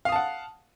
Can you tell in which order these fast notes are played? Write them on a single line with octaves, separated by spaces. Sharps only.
F5 D#6 A5 F#5